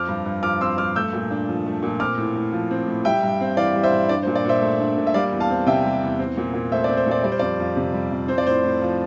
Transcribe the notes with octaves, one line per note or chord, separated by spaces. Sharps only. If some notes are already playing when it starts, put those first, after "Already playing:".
Already playing: F2 C4 D6 F6
G2
G2
F3 D6 F6
C4 C6 E6
G2 D6 F6
A3 E6 G6
A#2
D4
F3
A3
A#2
C4 D6 F6
A2
A2
F3
C4
A2
G3 E5 G5
G2
C4
E3 D5 F5
G3
C5 E5
G2
D4 D5
C5
A#2
D5
A#2 C5 E5
A3
D4
A#2
E5
G3 D5 F5
E2
F5 A5
C4
C3 E5 G5
G3
E2
C4
A#2
A#2
A3 C5 E5
D5
C4
C5
A#2 D5
G3 D5
C5
F2 D5
F2
C3
G3
F2
C4 C5
D5
A2 C5
A2
F3